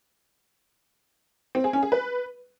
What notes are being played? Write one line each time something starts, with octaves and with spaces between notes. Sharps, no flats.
C4
G#4
C#4
G#4
B4